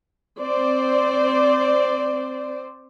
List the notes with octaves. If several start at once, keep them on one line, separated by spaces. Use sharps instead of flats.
C4 C5 D5